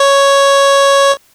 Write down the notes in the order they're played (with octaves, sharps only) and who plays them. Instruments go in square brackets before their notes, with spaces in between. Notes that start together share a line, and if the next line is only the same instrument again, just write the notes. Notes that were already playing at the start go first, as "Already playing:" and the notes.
Already playing: [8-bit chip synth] C#5